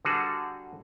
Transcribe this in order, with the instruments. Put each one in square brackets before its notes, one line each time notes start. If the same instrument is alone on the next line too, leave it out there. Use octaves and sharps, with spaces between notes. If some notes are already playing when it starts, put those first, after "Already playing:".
[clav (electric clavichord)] D3 G3 F#4 G#4 A4